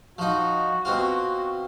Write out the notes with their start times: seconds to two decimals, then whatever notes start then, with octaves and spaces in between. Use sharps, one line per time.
0.18 F3 D#4 F#4
0.85 B2 C4 F4